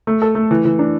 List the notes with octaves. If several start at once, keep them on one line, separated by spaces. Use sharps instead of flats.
A3
A4
A3
E3
E3
D4